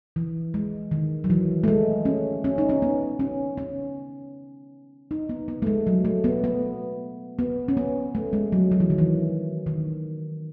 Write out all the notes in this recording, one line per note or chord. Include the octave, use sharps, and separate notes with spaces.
E3
G#3
D#3
F#3
E3
A3
G#3
C#4
C#4
D#4
C#4
B3
C#4
C#4
D#4
B3
B3
A3
G#3
F#3
A3
B3
B3
B3
C#4
B3
A3
G#3
F#3
F#3
E3
D#3
E3
D#3